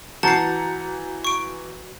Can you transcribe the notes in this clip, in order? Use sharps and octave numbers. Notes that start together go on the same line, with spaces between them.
E3 F#4 A5 A#5 G6 A6 C7 C#7
C#6 D7